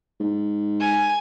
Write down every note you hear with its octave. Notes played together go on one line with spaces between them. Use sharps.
G#2
G#5